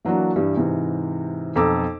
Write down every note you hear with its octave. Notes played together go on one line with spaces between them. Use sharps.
E3 F#3 A#3 D4 F#4
G2 E3 G3
G#2 C3 E3
B1 F2 A4 A#5 D6 E6